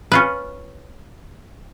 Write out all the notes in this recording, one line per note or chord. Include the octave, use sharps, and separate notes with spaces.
C#4 F4 B4